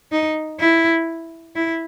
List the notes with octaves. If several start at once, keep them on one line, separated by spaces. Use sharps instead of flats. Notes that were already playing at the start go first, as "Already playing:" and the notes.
D#4
E4
E4